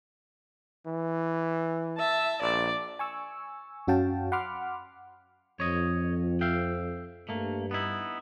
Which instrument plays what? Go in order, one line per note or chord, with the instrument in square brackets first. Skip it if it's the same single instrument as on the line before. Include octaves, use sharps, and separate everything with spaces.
[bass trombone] E3
[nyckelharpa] E5 A5
[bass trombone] A#1 [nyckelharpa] D5
[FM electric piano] G#5 C#6 E6
F#2 C#4 F#4 F5 G5 A5
F#5 B5 C6 D6 F6
[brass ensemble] F2 [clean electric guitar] C#5 D#5
[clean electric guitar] E5 F5 G5
[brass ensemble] G2 [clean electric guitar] A3 A#3
[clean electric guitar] B3 D#4 E4